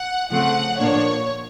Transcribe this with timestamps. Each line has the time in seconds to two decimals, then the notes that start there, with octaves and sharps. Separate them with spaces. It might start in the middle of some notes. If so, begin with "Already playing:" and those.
Already playing: F#5
0.31 C#3 F3 A3 C4 F#5
0.79 A#2 F3 A#3 D4 C#5